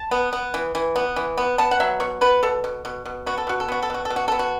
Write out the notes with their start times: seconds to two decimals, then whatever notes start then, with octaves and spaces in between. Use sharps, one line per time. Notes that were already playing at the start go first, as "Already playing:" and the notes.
Already playing: A5
0.11 B3
0.33 B3
0.54 E3
0.75 E3
0.96 B3
1.16 E3
1.37 B3
1.58 B3 A5
1.71 F#5
1.80 F#3 E5
2.00 B2 C#5
2.21 B3 B4
2.43 B2 A4
2.64 B2
2.85 B2
3.05 B2
3.26 B3 F#4
3.38 A4
3.47 B2 F#4
3.60 A4
3.68 B3 F#4
3.82 A4
3.90 B2 F#4
4.05 A4
4.10 B2
4.16 F#4
4.28 B3 A4
4.39 F#4